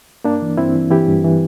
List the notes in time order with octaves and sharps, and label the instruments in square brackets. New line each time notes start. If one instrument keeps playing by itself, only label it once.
[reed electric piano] G2 A#3 D4
E3
G2 C4 E4
E3
E3 E4 G4
G2
E3